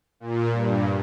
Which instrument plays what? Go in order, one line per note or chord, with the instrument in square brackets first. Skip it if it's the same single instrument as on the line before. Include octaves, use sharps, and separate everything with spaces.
[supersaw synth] A#2
G2